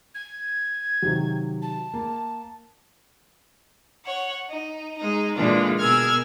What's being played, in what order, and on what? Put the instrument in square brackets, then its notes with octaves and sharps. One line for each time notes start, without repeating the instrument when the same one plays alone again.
[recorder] G#6
[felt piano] C3 D#3 F#3
[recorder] A5
[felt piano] A#3
[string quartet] C#5 F#5
D#4
G#3 D#4
A#2 D3 E3 G#3 D4 F4
B2 G#4 A#4 E6 F6 G#6